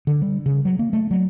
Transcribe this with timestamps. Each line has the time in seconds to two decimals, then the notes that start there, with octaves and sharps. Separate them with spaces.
0.07 D3
0.22 G3
0.46 C#3
0.65 F#3
0.79 A#3
0.93 A3
1.11 F#3